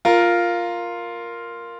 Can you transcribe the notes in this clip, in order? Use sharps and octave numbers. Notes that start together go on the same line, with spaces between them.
F4 A#4